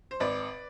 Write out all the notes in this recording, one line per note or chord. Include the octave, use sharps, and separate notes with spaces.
C5
G#1 B4 D5